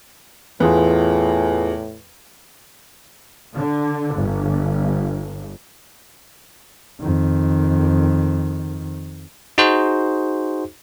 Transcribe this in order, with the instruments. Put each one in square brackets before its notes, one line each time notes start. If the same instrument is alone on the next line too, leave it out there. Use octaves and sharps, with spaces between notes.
[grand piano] E2 [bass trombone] A2 [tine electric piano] F4 G#4 B4
[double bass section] D3
G1
[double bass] F2 D#3
[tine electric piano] D#4 F#4 G#4 C5